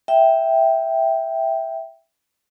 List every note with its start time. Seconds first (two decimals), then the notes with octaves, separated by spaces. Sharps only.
0.08 E5 G5